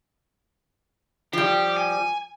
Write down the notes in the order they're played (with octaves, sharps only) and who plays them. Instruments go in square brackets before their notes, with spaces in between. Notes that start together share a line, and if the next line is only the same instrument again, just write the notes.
[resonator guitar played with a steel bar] F3 G3 [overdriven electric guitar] G4
[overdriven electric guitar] G#5